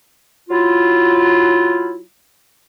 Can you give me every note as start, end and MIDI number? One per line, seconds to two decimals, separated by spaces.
0.49 1.98 54
0.49 1.98 64
0.49 1.98 65